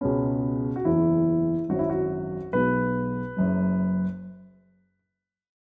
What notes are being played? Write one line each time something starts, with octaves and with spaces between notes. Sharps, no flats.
C#2 B2 G#3 B3 C#4
F#4
F#1 E2 E3 E4
G#1 F#2 F#3 F#4
E4
F#4
B1 B2 G#3 B3 B4
F#1 F#2 F#3